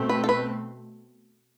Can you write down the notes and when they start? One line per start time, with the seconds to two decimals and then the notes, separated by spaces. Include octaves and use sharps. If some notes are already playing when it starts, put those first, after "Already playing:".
Already playing: B2 A3 C4
0.09 B4
0.24 A4
0.29 B4